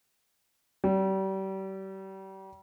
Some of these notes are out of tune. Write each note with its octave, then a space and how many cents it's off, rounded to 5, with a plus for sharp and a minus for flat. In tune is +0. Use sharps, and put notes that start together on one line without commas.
G3 -35